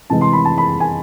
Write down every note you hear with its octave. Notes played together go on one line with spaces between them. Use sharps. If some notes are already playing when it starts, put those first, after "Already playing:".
C3 E3 G#3 A5
C6
B5
A5
B5
G#5